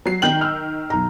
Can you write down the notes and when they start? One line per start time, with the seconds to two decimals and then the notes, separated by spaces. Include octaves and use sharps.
0.06 F#3 C7
0.22 D#3 D#4 G5 G6 F#7
0.41 E6 F6
0.90 B1 A#5